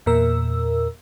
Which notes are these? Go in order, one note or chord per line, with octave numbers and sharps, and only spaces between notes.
E2 A#2 A#4 E6